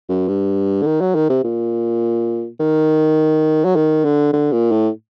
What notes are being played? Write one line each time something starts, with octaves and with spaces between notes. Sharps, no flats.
F#2
G2
D3
D#3
F#3
D#3
C3
A#2
D#3
F#3
D#3
D3
D3
A#2
A2